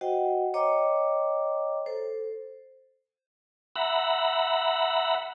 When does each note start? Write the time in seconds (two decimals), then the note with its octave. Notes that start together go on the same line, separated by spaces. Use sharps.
0.01 F#4 C5 D#5 F#5 G5
0.54 C#5 D#5 G5 A#5 D6
1.86 A4 C5
3.76 E5 F#5 A#5 B5